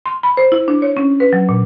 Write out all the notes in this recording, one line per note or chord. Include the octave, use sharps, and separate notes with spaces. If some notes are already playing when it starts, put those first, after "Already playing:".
C6
B5
C5
E4
D4
C#5
C#4
B4
F#3
A#2